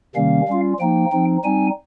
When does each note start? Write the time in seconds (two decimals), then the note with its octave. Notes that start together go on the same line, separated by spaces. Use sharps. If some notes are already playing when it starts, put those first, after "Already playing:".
0.16 C3 D#3 G3 A#3 C#4 F5
0.48 G3 C#4 F4
0.80 F3 A#3 D#4 G5
1.12 F3 C4 D#4
1.44 G3 C4 D#4 G#5